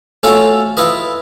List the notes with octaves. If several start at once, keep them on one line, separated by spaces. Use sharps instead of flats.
A3 C#4 F4 F#4 A4
E4 F4 B4 D#5